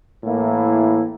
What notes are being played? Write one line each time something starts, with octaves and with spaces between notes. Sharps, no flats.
A2 E3 A#3 E4